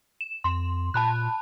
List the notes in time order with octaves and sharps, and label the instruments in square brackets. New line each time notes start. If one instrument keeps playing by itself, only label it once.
[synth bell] E7
[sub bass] F2 [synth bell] C6
[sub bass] A#2 [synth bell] A5 B5 F#6